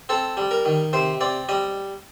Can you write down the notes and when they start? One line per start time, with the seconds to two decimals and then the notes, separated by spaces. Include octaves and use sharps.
0.09 C4 A4
0.37 G3
0.51 A#4
0.65 D#3
0.93 C3 C5
1.21 C4 D5
1.49 G3 D#5